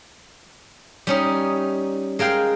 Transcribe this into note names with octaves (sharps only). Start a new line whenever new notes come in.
G3 C#4 D#4
G#3 A#4 F5 G5